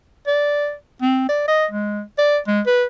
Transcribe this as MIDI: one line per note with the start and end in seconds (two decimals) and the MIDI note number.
0.27 0.74 74
1.02 1.25 60
1.29 1.45 74
1.48 1.66 75
1.71 2.02 56
2.18 2.38 74
2.47 2.61 56
2.66 2.85 71